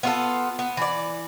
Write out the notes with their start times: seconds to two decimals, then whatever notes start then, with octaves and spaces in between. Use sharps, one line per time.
0.03 B3 F4 A4
0.59 B3
0.77 E3 D5